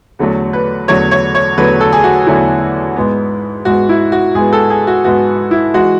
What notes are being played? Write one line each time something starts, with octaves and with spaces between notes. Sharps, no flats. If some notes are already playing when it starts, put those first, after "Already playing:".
E2 D3 F#3 A3
B4
E2 D3 F#3 A3 C#5
C#5
C#5
E2 D3 F#3 A3 B4
A4
G#4
F#4
E2 D3 F#3 A3 E4
G#2 G#3 B3
G#2 G#3 B3 F#4
E4
F#4
G#2 G#3 B3 G#4
A4
G#4
F#4
G#2 G#3 B3 F#4
E4
E3 G#3 F#4